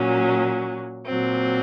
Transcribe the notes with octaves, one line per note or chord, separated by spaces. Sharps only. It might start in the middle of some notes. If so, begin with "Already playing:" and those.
Already playing: A#2 F#3 C#4
A#2 F#3 C4